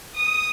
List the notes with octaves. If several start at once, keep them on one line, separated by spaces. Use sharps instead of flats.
D#6